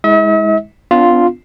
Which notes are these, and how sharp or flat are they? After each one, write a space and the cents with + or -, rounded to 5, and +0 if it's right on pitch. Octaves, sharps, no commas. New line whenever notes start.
G#3 +0 E4 -40 E5 -45
B3 +30 D4 -15 F4 +0